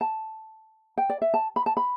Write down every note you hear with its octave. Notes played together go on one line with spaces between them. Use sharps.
A5
G5
D5
E5
A5
B5
A5
B5